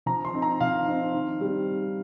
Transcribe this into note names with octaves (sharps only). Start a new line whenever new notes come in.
F3 A#5
C6
C4 D#4
A#5
F3 F5
C4 D#4
D#3
G3 C4